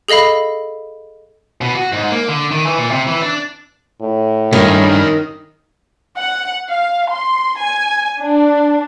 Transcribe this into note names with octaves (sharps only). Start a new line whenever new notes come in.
G#4 A4 D#5 F5 B5
B2
F#4
G#2
A#3
D3
D#3
E3
A#2
C3
E3
D4
A2
G2 D#3 C#4 A#4
F#5
F5
C6
G#5
D4